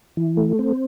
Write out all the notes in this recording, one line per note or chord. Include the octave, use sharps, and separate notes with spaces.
E3
A3
C4